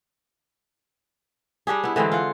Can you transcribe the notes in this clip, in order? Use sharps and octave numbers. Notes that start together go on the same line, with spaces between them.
G3 D4 G4 G#4
B3 E4
D3 E3 G#3 C4
F4 F#5